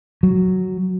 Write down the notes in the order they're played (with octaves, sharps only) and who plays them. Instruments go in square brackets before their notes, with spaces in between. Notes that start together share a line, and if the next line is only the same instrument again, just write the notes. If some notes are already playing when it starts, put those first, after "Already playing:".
[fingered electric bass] F#3